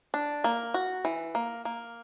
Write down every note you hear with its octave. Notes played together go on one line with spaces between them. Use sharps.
D4
A#3
F#4
E3
A#3
A#3